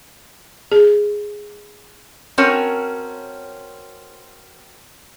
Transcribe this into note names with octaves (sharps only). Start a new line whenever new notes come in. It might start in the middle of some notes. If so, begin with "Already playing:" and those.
G#4
C4 C#4 F#4 A#4 C#5 A5